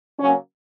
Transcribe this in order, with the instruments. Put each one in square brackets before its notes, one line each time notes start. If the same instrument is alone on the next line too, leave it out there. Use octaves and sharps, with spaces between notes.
[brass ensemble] C#3 F#3 A#3 C#4